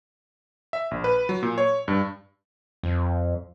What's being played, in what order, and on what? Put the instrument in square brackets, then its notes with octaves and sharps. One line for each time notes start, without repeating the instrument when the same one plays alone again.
[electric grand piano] E5
A#1
B4
F#3
A#2
C#5
G2
[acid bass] F2